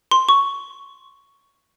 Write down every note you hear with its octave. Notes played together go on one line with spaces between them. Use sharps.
C6
C#6